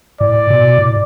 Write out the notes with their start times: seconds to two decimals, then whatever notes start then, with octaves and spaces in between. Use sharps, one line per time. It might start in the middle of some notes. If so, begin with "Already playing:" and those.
0.21 A2 D5
0.50 B2
0.79 A2